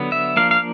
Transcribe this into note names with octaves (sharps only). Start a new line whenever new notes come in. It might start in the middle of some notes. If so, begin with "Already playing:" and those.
Already playing: D3 F#3 B3
E5
F3 A#3 D4 F5
F5